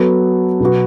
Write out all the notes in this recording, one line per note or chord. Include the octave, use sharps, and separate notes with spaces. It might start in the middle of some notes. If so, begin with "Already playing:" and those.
Already playing: F#3 B3 F#4 A4
B2 F#3 B3 F#4